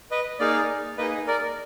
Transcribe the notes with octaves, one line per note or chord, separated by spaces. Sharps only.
B4 D#5
A#3 D#4 G#4 D5 F5
A#3 D#4 G#4 B4 D#5
A#4 D5